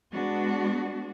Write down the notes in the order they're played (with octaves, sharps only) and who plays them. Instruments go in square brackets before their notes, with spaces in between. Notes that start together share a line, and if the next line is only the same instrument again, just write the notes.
[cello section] G#3 B3 D4 F#4